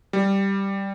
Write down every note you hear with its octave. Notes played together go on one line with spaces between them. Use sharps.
G3